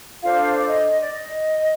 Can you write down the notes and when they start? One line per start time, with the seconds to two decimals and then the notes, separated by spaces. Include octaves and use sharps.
0.22 D4 F4 A4 C5 F5
0.57 D5
0.68 D#5
1.01 D5
1.12 D#5